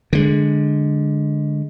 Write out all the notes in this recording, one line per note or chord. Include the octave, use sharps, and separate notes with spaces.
D3 G#3